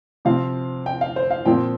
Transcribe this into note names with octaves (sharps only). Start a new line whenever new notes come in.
C3 F3 C4 F5
G5
F5
C5
F5
A#2 F3 C4 G5